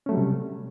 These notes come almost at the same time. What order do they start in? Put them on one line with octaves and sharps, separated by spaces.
C#4 A3 F#3 G3 C3